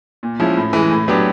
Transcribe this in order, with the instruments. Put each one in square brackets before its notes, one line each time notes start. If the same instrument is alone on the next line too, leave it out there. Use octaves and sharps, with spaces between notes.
[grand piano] A#2
F3 G#3 C#4 E4
A2
E3 G#3
A2
F#3 B3 D4 G4